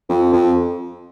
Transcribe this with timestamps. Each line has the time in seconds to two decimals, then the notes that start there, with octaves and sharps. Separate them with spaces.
0.09 F2
0.33 F2